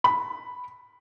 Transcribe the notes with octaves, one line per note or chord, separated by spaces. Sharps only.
B5